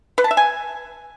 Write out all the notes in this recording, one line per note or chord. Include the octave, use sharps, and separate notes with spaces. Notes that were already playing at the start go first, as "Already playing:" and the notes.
B4
A5
E5
G#5